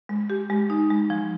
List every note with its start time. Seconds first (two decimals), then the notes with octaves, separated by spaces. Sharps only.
0.09 G#3
0.30 G4
0.50 G#3
0.70 D#4
0.90 G#3
1.10 F3